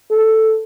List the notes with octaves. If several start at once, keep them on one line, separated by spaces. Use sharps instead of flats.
A4